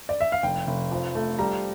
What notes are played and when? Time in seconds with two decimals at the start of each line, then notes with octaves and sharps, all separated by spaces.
0.09 D5
0.21 E5
0.32 F5
0.43 F1 G5
0.67 F1
0.91 F3
1.15 A3
1.38 G3 A#5